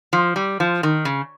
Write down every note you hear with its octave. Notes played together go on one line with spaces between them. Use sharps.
F3
G3
F3
D#3
C#3